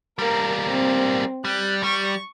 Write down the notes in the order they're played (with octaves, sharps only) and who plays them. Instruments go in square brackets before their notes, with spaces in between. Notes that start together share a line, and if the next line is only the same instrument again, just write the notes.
[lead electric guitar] G3 A#3 [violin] A#4
[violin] C4
[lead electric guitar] G3 [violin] F#6
[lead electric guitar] G3 [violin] C#6